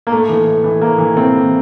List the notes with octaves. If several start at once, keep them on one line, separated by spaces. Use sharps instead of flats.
A#3
A2 A3
E3
A2
E3
A2 A#3
E3
A2 C4
E3